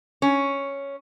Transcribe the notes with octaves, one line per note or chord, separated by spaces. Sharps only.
C#4